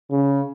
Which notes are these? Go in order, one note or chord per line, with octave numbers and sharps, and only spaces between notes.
C#3